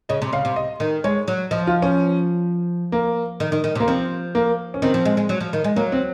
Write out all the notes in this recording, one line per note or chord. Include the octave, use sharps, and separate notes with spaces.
C#3 D#5
C3
C#3 F5
C3
D#5
D#3
G#3 C#5
F#3
F3 D#5
F4
C#4
A#3
D#3
D#3
D#3
C3
A#3
F3 C4
A#3
C#4
D#3 C4
F3
G#3
G#3
F#3
F3
D#3
G#3
F#3 A#3
C4